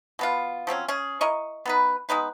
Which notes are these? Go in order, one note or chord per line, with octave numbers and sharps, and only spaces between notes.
B2 B3 F4
F3 F#3 C4 C#4
C#4 G#4
E4 A#4 D#5 C#6
B3 D#4 B4
G#3 B3 D#4 B4